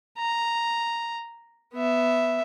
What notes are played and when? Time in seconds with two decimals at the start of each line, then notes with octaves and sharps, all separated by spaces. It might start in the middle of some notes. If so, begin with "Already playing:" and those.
0.18 A#5
1.74 B3 E5